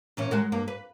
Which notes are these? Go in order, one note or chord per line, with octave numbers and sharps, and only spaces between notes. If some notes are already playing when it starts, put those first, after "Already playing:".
A#2 E3 C#4
G#3 F#4 A#4
G2 A#3
B4